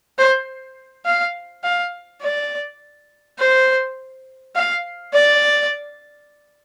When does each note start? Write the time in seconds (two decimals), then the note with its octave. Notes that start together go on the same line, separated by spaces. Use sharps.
0.18 C5
1.05 F5
1.64 F5
2.22 D5
3.39 C5
4.55 F5
5.14 D5